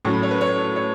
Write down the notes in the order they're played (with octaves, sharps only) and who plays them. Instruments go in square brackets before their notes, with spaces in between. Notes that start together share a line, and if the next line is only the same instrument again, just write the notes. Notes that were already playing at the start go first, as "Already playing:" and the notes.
[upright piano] A2 F#3 C#4 C#6
B5
C#5
B4
C#5
C#5